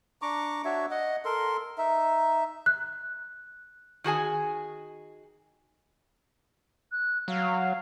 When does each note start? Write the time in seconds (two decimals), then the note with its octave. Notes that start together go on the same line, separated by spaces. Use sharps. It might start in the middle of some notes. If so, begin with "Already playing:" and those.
0.22 D4 A#5 C#6 D6
0.65 D4 F#4 C#5 E5
0.91 D#5 F#5
1.25 A4 A#4 C6
1.78 D#4 E5
2.66 F#6
4.04 D#3 F#4 G#4 G#5
6.92 F#6
7.28 F#3 F5